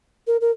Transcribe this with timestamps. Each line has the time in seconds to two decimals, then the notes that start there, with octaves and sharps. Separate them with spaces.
0.27 A#4
0.41 A#4